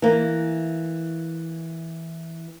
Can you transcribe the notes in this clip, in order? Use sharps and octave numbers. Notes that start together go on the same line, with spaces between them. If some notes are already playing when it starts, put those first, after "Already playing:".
E3 A#3